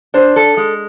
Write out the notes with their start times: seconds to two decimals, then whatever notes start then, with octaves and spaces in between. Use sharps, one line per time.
0.14 D4 C5
0.36 A4
0.57 G#3